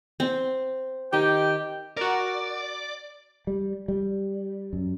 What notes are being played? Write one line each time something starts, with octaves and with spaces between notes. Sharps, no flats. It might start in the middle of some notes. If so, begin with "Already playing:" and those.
C4
D#3 D#4 G4 G5
F#4 A#4 D5
G3
G3
F#2